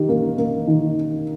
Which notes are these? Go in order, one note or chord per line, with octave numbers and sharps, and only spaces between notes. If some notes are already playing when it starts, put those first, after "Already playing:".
Already playing: D#3 G4
A#3
A#3
D#3